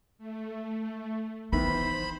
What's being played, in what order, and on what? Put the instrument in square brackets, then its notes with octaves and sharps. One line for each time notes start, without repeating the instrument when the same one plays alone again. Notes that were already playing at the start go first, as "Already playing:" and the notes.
[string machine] A3
[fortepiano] D#3 E3 [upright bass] B3 [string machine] C5 [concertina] B5